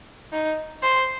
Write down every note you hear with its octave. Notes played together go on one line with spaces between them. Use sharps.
D#4
C5